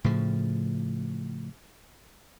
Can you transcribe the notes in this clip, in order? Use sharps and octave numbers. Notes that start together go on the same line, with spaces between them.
A2 C#3 F3